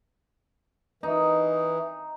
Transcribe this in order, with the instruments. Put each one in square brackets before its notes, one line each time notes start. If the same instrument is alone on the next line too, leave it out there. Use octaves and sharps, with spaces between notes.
[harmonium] E3 [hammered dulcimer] D#4